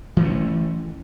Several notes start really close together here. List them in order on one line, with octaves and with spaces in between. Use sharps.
E3 A3 C#4